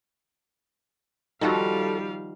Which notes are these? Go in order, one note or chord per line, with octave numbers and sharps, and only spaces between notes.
D#3 F3 G3 F#4 A4 F5